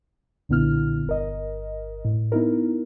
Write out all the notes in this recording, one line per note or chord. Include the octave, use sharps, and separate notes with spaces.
B1 A#2 D3 B3 E4 F6
G1 A#4 D#5
A2
B3 D#4 E4 A#4